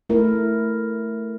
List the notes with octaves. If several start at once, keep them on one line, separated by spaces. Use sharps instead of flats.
A3 E4 A#4